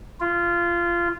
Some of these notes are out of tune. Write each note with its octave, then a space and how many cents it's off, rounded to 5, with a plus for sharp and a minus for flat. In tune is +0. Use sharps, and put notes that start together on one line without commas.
F4 -20